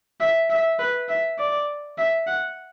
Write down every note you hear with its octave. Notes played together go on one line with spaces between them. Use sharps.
E5
E5
B4
E5
D5
E5
F#5